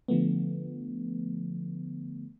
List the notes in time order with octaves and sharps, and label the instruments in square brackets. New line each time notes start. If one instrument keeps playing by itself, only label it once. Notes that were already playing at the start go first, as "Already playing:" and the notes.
[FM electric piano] D3 F3 A3 B3